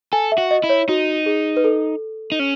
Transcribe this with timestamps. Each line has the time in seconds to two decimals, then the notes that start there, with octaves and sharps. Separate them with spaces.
0.13 A4 G#5
0.32 E5
0.38 F#4
0.51 D#5
0.64 E4
0.69 C#5
0.89 D#4 F#4
1.26 G#4
1.57 B4
1.64 A4
2.32 D#4
2.39 C#4